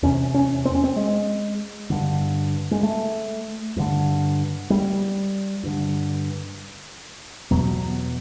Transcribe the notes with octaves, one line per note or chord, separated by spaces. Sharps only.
E2 C3 C#4
C#4
C4
C#4
C4
G#3
G2 D3
G#3
A3
G2 D3
G3
G2 D3
E2 B2 F#3